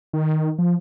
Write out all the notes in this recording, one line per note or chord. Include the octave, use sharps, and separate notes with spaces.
D#3
F3